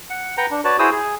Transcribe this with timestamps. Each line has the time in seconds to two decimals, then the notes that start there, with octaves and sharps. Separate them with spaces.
0.10 F#5
0.37 B4 F#5 G5 A#5
0.51 D4
0.65 F#4 B4 C#5 D5 A5
0.79 E4 F#4 G#4 C5 D#6 E6
0.92 G#4